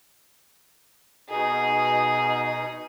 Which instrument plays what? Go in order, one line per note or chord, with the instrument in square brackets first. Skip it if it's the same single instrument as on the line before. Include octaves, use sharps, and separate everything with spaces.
[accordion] B2 D#4 [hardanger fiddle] G#4